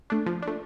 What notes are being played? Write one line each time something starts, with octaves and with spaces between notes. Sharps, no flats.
A3 D4
F3
D4
A3